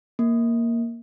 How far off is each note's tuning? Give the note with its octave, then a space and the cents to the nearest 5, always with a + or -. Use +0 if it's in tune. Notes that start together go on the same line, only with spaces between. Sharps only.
A#3 +0